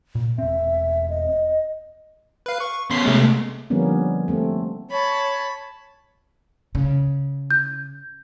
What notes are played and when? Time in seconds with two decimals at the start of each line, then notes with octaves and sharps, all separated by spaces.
0.15 A#2
0.38 E1 C4 E5
1.10 D#5
2.46 B4 F5
2.60 C#6
2.91 B2 C#4 C6 B6 C7
3.05 C3 G#3 A3
3.70 D3 F3 G3 A#3 B3 C#4
4.28 A3 C4
4.90 C#5 A5 B5
6.75 C#3
7.51 G6